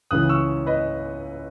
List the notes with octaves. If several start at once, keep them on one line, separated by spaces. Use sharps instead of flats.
C#2 C#3 E3 D#6 F#6
C#6 E6
B4 D#5